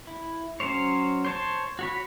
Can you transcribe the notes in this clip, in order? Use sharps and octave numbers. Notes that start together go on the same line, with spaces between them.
E4
F#3 C#4 C5 C#5
C5 C#5 A5
F#4 C#5 B5